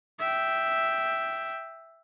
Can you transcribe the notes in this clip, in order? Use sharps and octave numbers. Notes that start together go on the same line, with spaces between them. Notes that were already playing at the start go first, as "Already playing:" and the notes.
E5 G5